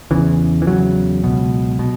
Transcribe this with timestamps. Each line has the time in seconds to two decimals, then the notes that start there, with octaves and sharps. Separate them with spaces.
0.11 E2 C#3 E3
0.62 E3
0.67 E2 C#3 F#3
1.24 C#2 B2
1.79 B2